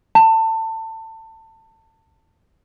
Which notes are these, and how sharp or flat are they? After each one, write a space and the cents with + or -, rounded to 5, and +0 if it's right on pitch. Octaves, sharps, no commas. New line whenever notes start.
A5 +25